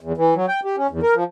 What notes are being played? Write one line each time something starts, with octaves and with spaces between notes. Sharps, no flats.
E2
E3
F#3
G5
G4
C#4
E2
A#4
F3